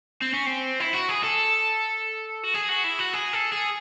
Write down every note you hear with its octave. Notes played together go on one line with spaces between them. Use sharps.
C4
C#4
C4
E4
F#4
G#4
A4
F#4
G#4
F#4
E4
F#4
G#4
A4
G#4